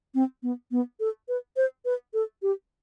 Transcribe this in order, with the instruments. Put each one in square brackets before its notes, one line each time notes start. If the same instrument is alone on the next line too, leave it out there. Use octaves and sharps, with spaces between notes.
[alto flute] C4
B3
B3
A4
B4
C5
B4
A4
G4